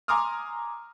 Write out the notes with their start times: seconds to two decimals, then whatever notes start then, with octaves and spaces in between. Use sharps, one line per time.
0.08 G#5 A#5 C6 D6 D#6 F6